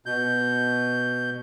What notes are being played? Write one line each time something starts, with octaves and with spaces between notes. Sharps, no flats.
B2 G6